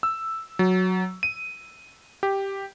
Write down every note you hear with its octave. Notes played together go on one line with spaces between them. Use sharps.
E6
F#3
D#7
G4